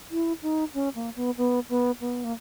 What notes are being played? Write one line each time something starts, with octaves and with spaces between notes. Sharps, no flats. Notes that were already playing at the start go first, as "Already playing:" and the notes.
E4
D#4
C#4
A#3
B3
B3
B3
B3
A#3